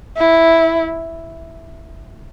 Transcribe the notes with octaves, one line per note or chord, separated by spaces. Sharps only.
E4